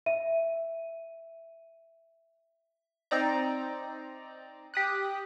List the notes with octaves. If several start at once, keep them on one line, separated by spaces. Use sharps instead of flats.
E5 D#7
C4 D#4 D5 A#5
G4 D#6 F#6